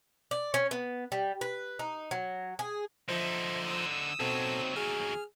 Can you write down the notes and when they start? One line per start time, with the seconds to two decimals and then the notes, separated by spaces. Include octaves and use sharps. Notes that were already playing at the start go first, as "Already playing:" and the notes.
0.31 D5
0.54 C#4
0.71 B3
1.12 G3
1.41 B4
1.79 D#4
2.11 F#3
2.59 G#4
3.09 D3 F3 D#4 C5 E5
3.65 D#6 E6
4.20 D#2 B2 F#3 C4 A4
4.76 G#4 F6